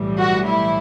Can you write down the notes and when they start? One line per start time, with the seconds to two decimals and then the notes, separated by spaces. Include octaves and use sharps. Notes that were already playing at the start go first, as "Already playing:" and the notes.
Already playing: B1 A2 E3 G3
0.19 F#4
0.47 E4